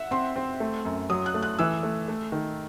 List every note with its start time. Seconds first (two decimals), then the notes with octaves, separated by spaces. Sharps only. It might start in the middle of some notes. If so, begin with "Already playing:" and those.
Already playing: E5 F#5
0.11 C4 C6
0.36 C4
0.60 A3
0.85 F#2
1.10 F#3 D#6
1.26 F#6
1.34 A3
1.43 F#6
1.59 E3 E6
1.83 A3
2.08 A3
2.32 D#3